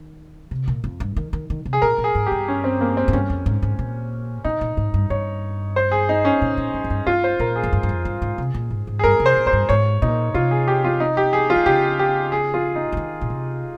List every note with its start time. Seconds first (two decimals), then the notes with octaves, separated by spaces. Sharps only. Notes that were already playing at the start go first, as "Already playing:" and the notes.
Already playing: D#3
0.51 C3
0.68 A#2
0.84 F2
1.00 G2
1.16 D#3
1.33 D#3
1.50 D#3
1.66 C3
1.73 G#4
1.82 A#2 A#4
1.98 A#2
2.04 G#4
2.15 G#2
2.26 G4
2.32 G2
2.48 C#4
2.64 C4
2.81 A#3
2.97 C4
3.08 G#2
3.13 G2 C#4
3.30 F2
3.46 G#2
3.62 G#2
3.79 A#2
4.44 A#2 D#4
4.61 A#2
4.77 G#2
4.94 G2
5.10 G2 C#5
5.76 C5
5.92 G#4
6.09 D#4
6.25 C#4
6.42 A#2
6.57 A#2
6.74 G2
6.84 G#2
6.90 G2
7.07 G2 F4
7.24 C5
7.39 A#2 A#4
7.56 G#4
7.63 F2
7.73 G2
7.83 G2
7.89 F2
8.05 G2
8.22 G#2
8.38 C3
8.54 A#2
8.70 G#2
8.87 G#2
8.99 G#4
9.04 G2 A#4
9.20 C3
9.26 C5
9.37 A#2
9.46 F2 C5
9.53 G2
9.69 G#2 C#5
10.02 A#2 D#4
10.34 C3 F4
10.51 G#4
10.68 G4
10.84 F4
11.00 D#4
11.17 G4
11.33 G#4
11.50 F4
11.56 D#3
11.66 C#3 G4
11.99 G4
12.32 G#4
12.54 F4
12.76 D#4
12.92 C#3
12.97 D#3
13.21 A#2
13.30 C3